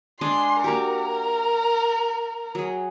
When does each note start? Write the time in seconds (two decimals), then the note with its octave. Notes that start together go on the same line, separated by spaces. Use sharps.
0.21 G#3 D4 G#4 C6
0.64 A#3 F#4 G4 A#4
2.55 F#3 G#4